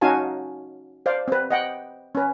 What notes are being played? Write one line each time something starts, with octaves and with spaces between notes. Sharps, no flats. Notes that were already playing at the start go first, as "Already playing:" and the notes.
C#4 D#4 F#4 F5 G#5 A5
C5 D5 F5
C4 B4
D#5 F#5 G5
C#4 B4